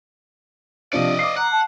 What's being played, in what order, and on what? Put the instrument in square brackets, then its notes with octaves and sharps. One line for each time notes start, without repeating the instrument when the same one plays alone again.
[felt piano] C3 F3 D4 [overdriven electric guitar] D5 D#5 [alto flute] F5
[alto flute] F5 [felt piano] D6 D#6 C7
[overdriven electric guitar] F#5 [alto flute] A#5
[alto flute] A5